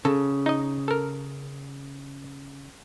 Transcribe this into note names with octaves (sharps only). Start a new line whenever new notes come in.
C#3 A4
D#4 D#5
A4 A#4